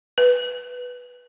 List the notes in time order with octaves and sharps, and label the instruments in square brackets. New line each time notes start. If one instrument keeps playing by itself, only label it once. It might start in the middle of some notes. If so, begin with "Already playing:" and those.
[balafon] B4